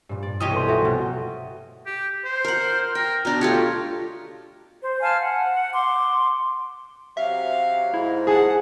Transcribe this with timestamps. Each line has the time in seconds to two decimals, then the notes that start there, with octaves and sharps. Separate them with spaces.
0.09 G2 A#2
0.23 D5
0.40 C2 B2 E3 C#4 G4 D#5 G5 D#6
0.52 A4 B4 C6
0.68 F3 F#3 A4 E5 G#5
0.85 C2 B2
1.86 G4
2.25 C5
2.45 A#4 F#5
2.95 A#4 G5
3.25 B2 D4 A#5
3.41 A3 F4 G4 C#5
4.81 C5
5.01 F5 G#5 A5 F6
5.22 F#5
5.72 C6 D6
7.17 C3 F#3 E5 F5
7.94 G#2 E4
8.27 G#4 F#5 A5